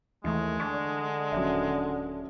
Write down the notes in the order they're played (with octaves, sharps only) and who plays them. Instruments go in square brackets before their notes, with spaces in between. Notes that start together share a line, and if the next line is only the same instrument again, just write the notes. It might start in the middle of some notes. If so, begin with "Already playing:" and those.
[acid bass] D#2 [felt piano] E3 A3 [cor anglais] G#3
[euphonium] D3 [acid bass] D4 [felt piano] C#6
[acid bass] D#1 [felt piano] F#3 C#4 E5